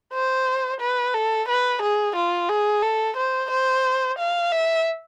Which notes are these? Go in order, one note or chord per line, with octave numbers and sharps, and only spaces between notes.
C5
B4
A4
B4
G#4
F4
G#4
A4
C5
C5
F5
E5